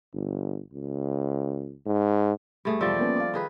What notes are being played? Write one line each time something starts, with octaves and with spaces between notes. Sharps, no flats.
G1
C#2
G#2
G2 A3 G#4
E1 F3 G3 D5 E6
A#3 B3 C#4
F5 D6
D#3 G#4 B4